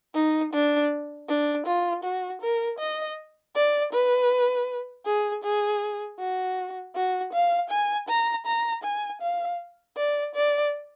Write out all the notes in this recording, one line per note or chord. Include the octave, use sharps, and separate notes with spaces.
D#4
D4
D4
F4
F#4
A#4
D#5
D5
B4
G#4
G#4
F#4
F#4
F5
G#5
A#5
A#5
G#5
F5
D5
D5